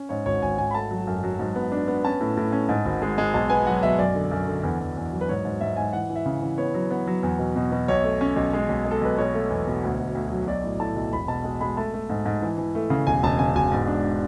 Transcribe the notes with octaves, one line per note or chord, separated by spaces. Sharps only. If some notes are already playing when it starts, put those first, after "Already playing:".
Already playing: C#4
G#2 C#5
G#1 C#5
G#1 G#5
G#1 G#5
B5
A3 A5
F#3
F#2
F#3
G#2
B3
D4
B3
C#4 A5
A2
A2
C#4
G#2
G#1
G#3
G#3
B1 A5
B3 G#5
F#3 F#5
B1 E5
F#2 D5
D3
F#2
D3
E2
E2
E2
F#3
B4
G#2 C#5
G#2
G#2 E5
G#2 G#5
E3 F#5
E3
E5
C#3
E3
B3 C#5
F#3
B3
F#3
E2
B2
B2
B2
B1 C#5
A3
C#4
B1
G#3
B1
G#3
A4
B1 B4
B2 C#5
A3
E2
B2
D2
D2
D2
F#3
B1 D5
A2
A2 A5
B1
E1 B5
B2 A5
G#3
G#3 B5
A3 A5
A3
G#2
G#2
E3
E3
A3
C#3
E1 G#5
E1 A5
C#3 G#5
E1 G#5
G#2
D4